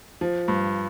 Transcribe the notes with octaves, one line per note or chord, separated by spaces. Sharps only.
F3
G2